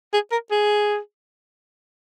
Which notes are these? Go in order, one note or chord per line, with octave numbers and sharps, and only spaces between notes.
G#4
A#4
G#4